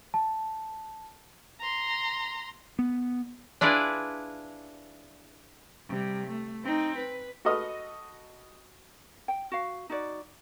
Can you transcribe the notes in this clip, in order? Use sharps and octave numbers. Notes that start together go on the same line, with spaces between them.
A5
A#5 C6
B3
D4 E4 F4 G#4 B4 D5
C3 G3
A3
C4 D#4
B4
F#4 A4 B4 D#5 D#6 F6
G5
F#4 F5
D#4 F#4 D5